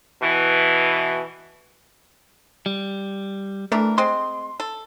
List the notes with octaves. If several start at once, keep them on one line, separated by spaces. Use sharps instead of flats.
B2 E3
G3
E3 A3 D4 A#4
G#3 C4 C6
A4